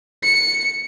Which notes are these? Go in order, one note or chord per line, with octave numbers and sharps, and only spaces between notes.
C#7